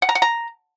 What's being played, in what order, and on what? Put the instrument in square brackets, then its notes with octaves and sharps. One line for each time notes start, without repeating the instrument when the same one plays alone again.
[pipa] F#5
A#5
F#5
A#5